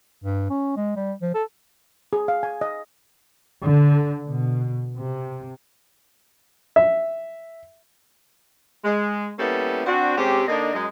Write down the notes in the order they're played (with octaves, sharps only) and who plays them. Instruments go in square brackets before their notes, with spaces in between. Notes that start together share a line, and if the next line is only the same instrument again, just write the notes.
[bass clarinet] G2
C#4
G#3
G3
F3
A4
[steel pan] G#4
F5
G#5
D#5
[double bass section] D3
B2
C3
[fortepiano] E5
[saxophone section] G#3
G3 A#3 B3 C#4 E4 A4
C4 D4 F#4
C3 G#3 C4 C#4 G4
D3 A#3 D4 D#4 D5 D#5
F#2 G#3 D#5